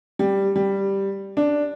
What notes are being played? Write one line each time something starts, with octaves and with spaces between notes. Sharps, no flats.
G3
G3
D4